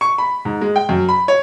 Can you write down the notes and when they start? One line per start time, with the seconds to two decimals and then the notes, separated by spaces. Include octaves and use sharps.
0.01 C#6
0.18 B5
0.45 G#2
0.61 G#3
0.76 G5
0.89 F#2
1.09 B5
1.28 C#5